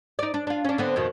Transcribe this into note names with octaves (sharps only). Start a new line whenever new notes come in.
D#4 D5
D4
D4 F4
C#4 D4
D3 B3 C4
F2 B2 D#3